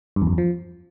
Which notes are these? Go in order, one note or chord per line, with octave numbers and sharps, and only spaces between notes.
G2
E2
F#2
E2
F3